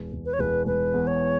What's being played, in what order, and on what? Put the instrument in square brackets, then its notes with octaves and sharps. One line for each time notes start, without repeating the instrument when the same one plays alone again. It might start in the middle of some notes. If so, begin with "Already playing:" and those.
Already playing: [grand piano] E1
E1
[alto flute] B4
C#5
[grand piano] E1 [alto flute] B4
[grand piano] E1 [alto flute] B4
[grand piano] E2
[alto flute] C#5